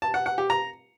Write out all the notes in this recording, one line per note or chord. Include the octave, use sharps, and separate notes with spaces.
A5
F#5
F#5
G4
A#5